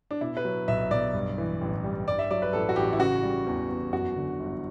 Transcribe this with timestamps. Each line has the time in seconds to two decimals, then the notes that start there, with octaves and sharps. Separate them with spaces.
0.11 D4
0.21 B2 E4
0.37 B4
0.45 F#3
0.68 B1 E5
0.91 B1 D5
1.14 G2
1.38 E3
1.61 A1
1.84 G3
2.08 G2 D5
2.19 E5
2.31 F#3 D5
2.42 B4
2.53 A1 A4
2.69 F#4
2.76 A1 G4
2.93 E4
2.99 C#3 F#4
3.23 G3
3.47 E2
3.69 E2
3.93 F#2 F#4
4.16 D3
4.40 G1